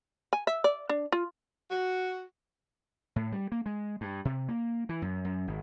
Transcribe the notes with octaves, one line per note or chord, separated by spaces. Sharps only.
G#5
E5
D5
D4
F4
F#4
A2
G3
A#3
G#3
G2
C3
A#3
E3
F#2
F#2
G#1